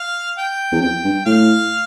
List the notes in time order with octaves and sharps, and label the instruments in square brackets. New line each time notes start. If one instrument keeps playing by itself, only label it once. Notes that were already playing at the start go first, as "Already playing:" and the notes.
Already playing: [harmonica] F5
G5
[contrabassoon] E2
[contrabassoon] F2 [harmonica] G5
[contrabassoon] G2
[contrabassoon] A2 [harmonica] F5